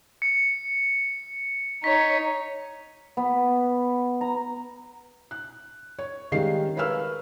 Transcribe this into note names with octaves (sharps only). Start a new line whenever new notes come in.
C#7
D#4 C#5 B6
B3
A#5
F#6
C#5
D#3 G3 G#3 C#4 F5 C7
A#4 B4 C#5 F5 E6 F6